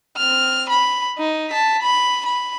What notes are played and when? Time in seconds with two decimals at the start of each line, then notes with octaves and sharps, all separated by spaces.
0.17 C4 F6
0.70 B5
1.18 D#4
1.50 A5 B6
1.82 B5
2.26 B5